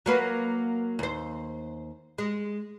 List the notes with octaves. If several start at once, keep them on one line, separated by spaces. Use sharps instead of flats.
F#3 A#3 B4
D#2 C5
G#3